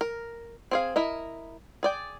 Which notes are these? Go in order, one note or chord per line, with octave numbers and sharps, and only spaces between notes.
A#4
C4 G#4 F5
E4 A#4 D#5
G#4 D5 G5